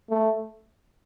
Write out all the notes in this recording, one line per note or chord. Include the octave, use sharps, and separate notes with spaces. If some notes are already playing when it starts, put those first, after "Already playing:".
A3